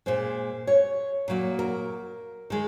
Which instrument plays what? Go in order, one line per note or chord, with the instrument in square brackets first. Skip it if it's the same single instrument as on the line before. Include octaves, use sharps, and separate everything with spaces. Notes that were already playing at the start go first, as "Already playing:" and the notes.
[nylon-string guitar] A#2 G#3 C5
C#5
A#2 F#3 A#3
A#4
D#3 G#3